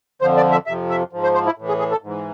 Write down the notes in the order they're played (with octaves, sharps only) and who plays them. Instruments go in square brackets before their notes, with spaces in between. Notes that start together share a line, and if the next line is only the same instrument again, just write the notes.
[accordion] F2 D3 F3 C5
D5
E5
F2 C3 F3 E5
E5
G#2 F3
C5
C5
E4
A2 E3
G#4
G#4
A4
G#2 E3